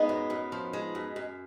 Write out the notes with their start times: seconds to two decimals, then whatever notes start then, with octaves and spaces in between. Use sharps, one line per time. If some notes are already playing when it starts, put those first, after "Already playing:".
Already playing: G#3 B3 D#4
0.09 F#2
0.30 F#2
0.52 F3
0.73 G#3
0.95 F#2
1.16 F#2